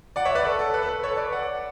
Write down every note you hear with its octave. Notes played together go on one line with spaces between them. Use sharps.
D5 F#5
C#5 E5
B4 D5
A4
A4
B4
A4
B4
A4 C#5
B4 D5
D5 F#5